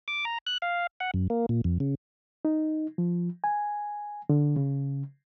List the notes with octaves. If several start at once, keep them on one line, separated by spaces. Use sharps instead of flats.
D6
A#5
F#6
F5
F#5
F#2
A#3
A#2
F2
C#3
D#4
F3
G#5
D3
C#3